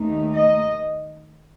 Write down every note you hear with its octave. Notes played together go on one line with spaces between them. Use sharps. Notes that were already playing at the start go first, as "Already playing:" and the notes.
Already playing: D#2 D#3 A3 D#4
D#5